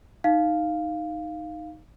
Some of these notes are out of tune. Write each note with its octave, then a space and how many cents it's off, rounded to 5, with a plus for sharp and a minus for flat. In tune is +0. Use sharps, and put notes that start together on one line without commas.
D#4 +0 F5 +0